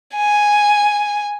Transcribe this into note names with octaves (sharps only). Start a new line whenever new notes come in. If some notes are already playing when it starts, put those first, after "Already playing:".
G#5